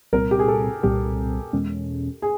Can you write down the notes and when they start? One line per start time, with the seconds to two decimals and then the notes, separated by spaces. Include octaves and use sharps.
0.13 C2 A#2 G3 C4 A#4
0.31 G4
0.39 G#4
0.48 A4
0.83 C2 A#2 G3 C4 G4
1.53 E2 B2 G#3 C#4
2.22 G#4